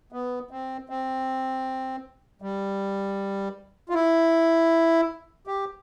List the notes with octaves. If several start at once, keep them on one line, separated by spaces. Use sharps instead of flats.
B3
C4
C4
G3
F4
E4
G4